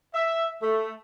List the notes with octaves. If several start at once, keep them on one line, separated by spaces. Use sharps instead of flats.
E5
A3